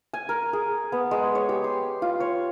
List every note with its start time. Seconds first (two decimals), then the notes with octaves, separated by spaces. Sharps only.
0.13 G#5
0.29 A#4
0.53 G#4
0.92 B3
1.11 G#3
1.35 C#5
1.49 G4
1.64 C6
2.02 F4
2.20 C#5